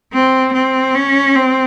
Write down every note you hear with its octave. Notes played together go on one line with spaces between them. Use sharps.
C4
C4
C#4
C4